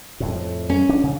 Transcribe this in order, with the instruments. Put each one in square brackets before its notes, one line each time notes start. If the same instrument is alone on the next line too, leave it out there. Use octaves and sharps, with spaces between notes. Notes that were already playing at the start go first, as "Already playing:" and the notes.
[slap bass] F2 A2
[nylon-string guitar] C#4
[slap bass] D4
C#3